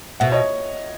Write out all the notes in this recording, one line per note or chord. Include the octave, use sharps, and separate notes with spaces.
B2 E5 F#5
C#5 D#5